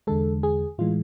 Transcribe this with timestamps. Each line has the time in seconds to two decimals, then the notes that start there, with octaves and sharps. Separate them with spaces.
0.07 E2 D3 G#3 A4
0.43 G#4
0.78 A2 E3 G#3 F4